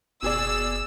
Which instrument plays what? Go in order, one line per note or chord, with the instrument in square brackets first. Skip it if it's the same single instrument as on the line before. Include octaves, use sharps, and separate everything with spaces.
[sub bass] F#1 [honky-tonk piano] B2 G#4 D5 [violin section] E6